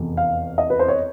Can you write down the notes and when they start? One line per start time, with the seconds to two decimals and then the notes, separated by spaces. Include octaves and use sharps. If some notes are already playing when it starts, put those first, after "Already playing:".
Already playing: F1 E2
0.17 F5
0.58 D#5
0.70 B4
0.79 C5
0.88 C#5